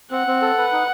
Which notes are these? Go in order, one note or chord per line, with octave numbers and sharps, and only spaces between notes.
C4 F#5
C4
A4
B4
D#4